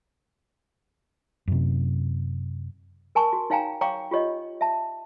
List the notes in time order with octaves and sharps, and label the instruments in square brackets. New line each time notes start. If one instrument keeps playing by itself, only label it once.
[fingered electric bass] F#2 C3
[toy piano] A#4 G#5 A5 C#6
F#4
D#4 C#5 F5 G5 G#5 A#5
C#5 F5 G5 A#5 C#6 D6
F4 G4 C#5 D#5
E5 A5